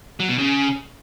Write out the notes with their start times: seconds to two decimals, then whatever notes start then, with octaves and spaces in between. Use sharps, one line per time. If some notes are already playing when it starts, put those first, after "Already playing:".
0.20 F#3
0.29 B2
0.38 C#3